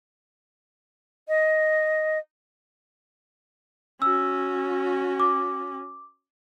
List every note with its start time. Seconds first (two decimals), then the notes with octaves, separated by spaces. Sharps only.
1.28 D#5
4.02 C#4 F#4 E6
5.20 D6